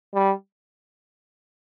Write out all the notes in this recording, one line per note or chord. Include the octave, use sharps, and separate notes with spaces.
G3